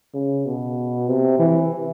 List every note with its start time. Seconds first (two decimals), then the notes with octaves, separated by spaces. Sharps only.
0.14 C#3
0.46 B2
1.08 C3
1.39 E3